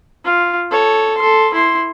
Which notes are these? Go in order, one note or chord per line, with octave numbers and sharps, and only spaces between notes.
F4
A4 C#5
A4 C6
E4 C6